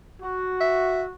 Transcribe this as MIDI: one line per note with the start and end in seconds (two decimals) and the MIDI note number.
0.21 1.15 66
0.60 1.02 76